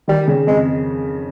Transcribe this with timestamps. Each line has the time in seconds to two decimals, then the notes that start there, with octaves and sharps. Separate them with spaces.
0.08 D#3 G3
0.27 C#3
0.47 F2 G#3